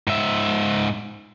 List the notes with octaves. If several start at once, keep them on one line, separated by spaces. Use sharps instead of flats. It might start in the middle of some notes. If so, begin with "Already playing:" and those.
G#2 E5